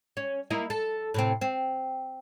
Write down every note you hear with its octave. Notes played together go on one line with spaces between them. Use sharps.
C#4
A#3 E4 D#5
A4
A2 C3 C4
C4